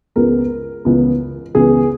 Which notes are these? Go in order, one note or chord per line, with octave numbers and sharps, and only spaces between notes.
C#2 C#3 G#3 B3 A#4
C#2 C#3 E3 B3
C#2 C#3 E3 B3 G#4